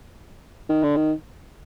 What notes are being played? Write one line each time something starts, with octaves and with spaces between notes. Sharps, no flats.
D#3
D3
D#3